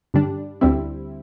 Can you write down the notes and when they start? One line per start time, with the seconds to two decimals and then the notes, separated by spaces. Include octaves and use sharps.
0.14 G2 D3 G3 D4
0.61 D2 D3 G3 C4 E4